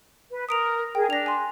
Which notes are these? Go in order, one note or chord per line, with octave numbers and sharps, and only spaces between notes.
B4
A#4 D#6 D7 F7
G#4 A#4 G5
D4 A#6 F7
G#5 C6